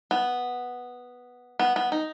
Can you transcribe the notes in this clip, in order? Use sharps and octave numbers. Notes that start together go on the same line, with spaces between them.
B3
B3
B3
D#4